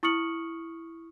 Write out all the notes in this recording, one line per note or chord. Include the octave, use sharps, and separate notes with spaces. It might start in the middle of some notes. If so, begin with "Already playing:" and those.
E4 C#6 D#6 F6 C#7 F#7